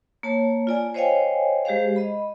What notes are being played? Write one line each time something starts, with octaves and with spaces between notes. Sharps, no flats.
A#3 C#5 A5
F4 D5 G#5
C5 C#5 D#5 F5 G5 G#5
G#3 G4 G#4 C5 F5
D#5 B5